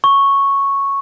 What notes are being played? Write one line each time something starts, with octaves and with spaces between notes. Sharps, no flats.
C#6